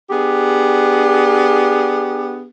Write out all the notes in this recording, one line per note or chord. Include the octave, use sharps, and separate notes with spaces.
B3 D4 G4 G#4